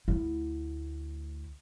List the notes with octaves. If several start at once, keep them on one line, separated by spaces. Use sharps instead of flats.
D2 E4